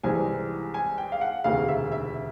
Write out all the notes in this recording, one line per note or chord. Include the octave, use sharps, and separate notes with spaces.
C2 C3 E3 G#3 C4 G#5
G#5
G5
F5
F#5
E1 D2 C3 D#3 F5
E5
E5